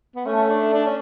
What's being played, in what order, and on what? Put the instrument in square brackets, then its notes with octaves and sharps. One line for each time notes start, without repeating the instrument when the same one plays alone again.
[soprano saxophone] B3
[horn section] A3 [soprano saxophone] C#4
[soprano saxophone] D4
D4
C#4